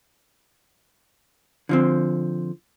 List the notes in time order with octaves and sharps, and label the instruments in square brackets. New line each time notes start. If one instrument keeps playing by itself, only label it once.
[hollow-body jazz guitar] D3 F3 C4